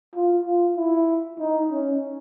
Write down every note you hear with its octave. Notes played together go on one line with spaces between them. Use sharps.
F4
F4
E4
D#4
C#4